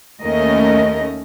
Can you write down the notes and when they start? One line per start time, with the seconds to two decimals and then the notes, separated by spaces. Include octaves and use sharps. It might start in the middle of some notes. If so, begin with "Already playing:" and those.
0.23 D#2 A3 C#4 A#4 D#5